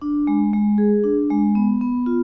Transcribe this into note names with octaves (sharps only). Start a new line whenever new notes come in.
D4
G#3
G#3
G#4
D4
G#3
B3
B3
F4